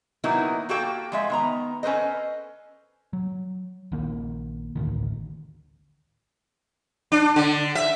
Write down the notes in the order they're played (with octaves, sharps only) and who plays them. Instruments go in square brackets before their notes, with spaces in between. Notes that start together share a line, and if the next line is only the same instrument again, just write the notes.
[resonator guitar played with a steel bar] D#3 F#3 A#3 B3 D#4 E4
A#3 F#4 G4 A4 G5
F3 G#3 E5
D#3 B3 A#5
C#4 A4 B4 C5 D#5
[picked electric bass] F#3
A#1 D#3 A#3
A1 D2 D#3
[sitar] D4
D3
E5